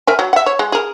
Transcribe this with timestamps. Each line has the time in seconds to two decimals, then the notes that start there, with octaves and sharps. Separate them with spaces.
0.07 A#4 E5 G#5
0.19 F#3
0.33 E5 F#5
0.46 C#5
0.59 G#3
0.72 G#4 A#4